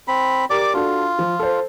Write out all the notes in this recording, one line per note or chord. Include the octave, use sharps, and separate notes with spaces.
C4 B5
G4 A#4 D5 D6
D4 F4 F#4 A4
F3
A4 C5